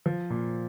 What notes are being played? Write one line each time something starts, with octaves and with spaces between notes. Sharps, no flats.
F3
A#2